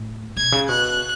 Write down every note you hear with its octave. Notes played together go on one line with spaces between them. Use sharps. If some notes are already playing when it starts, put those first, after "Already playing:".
Already playing: A2
B2 G#6
C#3
B2 F#6